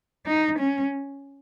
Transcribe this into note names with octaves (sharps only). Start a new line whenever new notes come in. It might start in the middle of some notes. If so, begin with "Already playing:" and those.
D#4
C#4